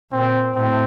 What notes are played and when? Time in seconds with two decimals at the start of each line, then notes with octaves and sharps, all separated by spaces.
0.12 A#2 C4
0.54 A2 C4